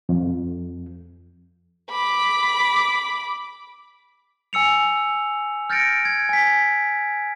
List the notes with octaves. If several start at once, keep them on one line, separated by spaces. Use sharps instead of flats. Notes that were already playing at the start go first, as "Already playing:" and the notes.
F2
B5 D6
G#5 E6 C#7 F7
F6 G6 A6 A#6 C#7 D7
G#6
G#5 B6